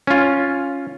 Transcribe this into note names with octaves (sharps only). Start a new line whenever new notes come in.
C#4 F4